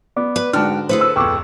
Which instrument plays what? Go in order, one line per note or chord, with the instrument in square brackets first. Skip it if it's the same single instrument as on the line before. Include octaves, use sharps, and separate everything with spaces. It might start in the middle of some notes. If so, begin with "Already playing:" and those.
[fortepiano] B3 [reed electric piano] D5 D6
[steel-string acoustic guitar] B4
[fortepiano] G#2 A5 F6 [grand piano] D3 F#4 [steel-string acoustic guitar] G5
[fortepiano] A2 [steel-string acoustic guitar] G#4 A4 B4 [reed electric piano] C5
[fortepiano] E6
[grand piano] D1 F2 [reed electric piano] G5 E6 [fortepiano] C#6 D6